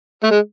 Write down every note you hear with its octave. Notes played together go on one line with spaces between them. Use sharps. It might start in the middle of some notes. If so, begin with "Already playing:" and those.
A3
G#3